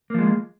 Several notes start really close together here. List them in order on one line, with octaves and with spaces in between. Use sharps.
A#3 F3 G#3